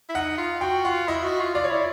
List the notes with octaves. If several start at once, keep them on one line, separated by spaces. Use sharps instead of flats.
E4
D#4 F#5
F4
F#4 G5
F4 F#5
E4 D#5
F#4
F4
F4 D5
C#5
E4 D5